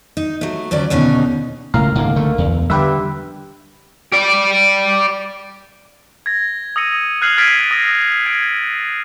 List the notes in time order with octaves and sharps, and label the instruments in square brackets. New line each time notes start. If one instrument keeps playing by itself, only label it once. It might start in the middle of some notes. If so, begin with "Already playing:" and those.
[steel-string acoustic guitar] D#4
F#3 A3
D2 F#3 C#4 D5
D#2 B2 D3 C#4 D#4
[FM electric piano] C#2 A#4 F5 [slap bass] A2
[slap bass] G#2 D3 A#3
D3 A3
E2
[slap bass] D3 G3 [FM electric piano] G4 B4 E5
[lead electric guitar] G4 D5
[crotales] G#6 A#6
D#6 E6 A#6 C#7 D#7
F6 F#6 G#6 C7 F7 F#7
F6 G#6 A6 B6 D7 D#7
D#6 A#6
G#6 D7